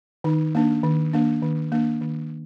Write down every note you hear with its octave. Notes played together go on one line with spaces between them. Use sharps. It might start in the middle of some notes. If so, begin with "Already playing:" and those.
D#3 D#4
A#3 D4
D#3
A#3 D4
D#3
A#3 D4
D#3